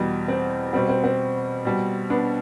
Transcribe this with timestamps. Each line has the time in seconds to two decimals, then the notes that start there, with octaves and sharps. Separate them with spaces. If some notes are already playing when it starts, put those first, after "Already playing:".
Already playing: E2 B2 G3
0.28 C4
0.73 B2 G3 C4
0.89 C4
1.04 C4
1.65 B2 G3
2.10 B3 D4